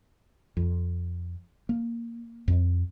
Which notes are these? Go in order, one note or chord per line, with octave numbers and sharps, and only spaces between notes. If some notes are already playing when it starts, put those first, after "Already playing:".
F2
A#3
F2